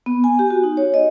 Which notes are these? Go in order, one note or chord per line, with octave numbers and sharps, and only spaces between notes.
B3
G#5
G4
F#4
D#4
C#5
D#5